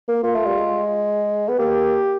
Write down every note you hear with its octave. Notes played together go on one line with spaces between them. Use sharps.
A#3
A#3 F4
A3
G3
G#3
B3
A#3 G4